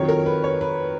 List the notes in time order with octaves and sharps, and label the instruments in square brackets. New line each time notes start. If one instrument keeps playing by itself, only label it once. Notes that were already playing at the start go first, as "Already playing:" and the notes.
Already playing: [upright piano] F2 D#3 F#3 C#5
A#4
B4
C#5
B4